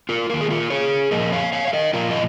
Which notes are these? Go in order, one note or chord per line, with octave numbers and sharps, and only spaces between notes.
F4 A#4
D#3 A#3 A#4
G#4
F4 A#4
G#4 C#5
A#2 F3 A#3 A#4 D#5
C#5 F5
C#5 F5
F5
A#4 D#5
A#2 F3 A#3 F4 A#4
D#5